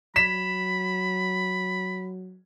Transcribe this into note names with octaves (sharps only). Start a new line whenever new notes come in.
F#3 B5 B6 E7